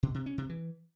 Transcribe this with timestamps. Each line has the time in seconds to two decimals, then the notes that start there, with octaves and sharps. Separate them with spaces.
0.03 B2
0.14 C3
0.26 C#4
0.38 C3
0.49 E3